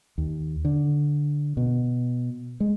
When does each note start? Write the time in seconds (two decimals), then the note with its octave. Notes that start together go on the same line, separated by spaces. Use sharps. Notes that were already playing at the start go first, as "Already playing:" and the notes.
0.18 D#2
0.65 D3
1.57 B2
2.60 G#3